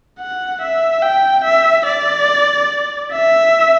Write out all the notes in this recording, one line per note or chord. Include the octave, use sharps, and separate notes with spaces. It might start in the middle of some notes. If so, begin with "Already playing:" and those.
F#5
E5
G5
E5
D5
E5